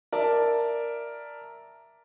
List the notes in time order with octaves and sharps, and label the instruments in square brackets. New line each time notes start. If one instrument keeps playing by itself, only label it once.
[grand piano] A#4 D5 E5 A5